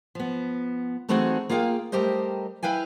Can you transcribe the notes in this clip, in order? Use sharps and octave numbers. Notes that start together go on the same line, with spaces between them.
F3 B3
E3 A3 C4 D#4 F#4 G#4
A#3 F4 G#4 F5 G5
G3 A3 G4 A#4 C5 D#5
E4 B4 F5 G5 G#5